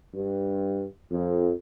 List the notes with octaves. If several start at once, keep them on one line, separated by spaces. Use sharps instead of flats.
G2
F2